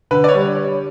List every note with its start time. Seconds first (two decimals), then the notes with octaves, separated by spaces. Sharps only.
0.11 D3 B4
0.24 D5
0.28 C#5
0.34 G3